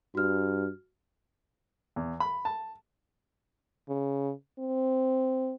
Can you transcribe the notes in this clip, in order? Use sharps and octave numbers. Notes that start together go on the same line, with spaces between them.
G2 F#4 F6
E2
B5
A5
C#3
C4